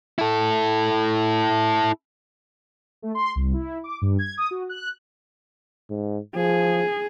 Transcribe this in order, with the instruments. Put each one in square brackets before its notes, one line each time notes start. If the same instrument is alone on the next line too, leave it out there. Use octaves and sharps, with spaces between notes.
[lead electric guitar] E4 A4
[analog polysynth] A3
C6
C2
E4
D6
G2
G#6
D#6
F#4
F#6
[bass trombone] G#2
[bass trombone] F3 [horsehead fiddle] G#4